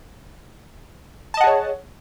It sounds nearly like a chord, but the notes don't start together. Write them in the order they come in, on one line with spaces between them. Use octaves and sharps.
A5 D#5 F#5 G#4 C#5